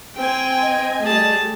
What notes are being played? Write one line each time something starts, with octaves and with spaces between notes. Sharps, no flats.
C4 G5 G#5
D#5
G3 A3 G#4 A5